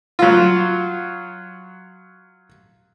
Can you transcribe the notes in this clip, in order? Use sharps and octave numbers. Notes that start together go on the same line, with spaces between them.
F#3 F4